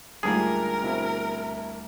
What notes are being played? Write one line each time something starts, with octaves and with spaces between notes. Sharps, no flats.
D2 G#2 G3 A#3 F4 G#4 A#4
B2 C4 E4